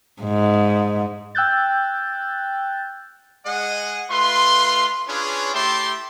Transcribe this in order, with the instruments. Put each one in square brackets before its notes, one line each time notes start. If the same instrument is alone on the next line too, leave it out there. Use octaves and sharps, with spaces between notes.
[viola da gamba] G#2
[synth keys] G5 E6 F#6 G6 A6
[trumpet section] G#3 G#4 D#5 F#5
A3 F4 B4 C6
C#4 D4 F4 G#4 B4 C#5
A3 E4 G4 G5 A5 C6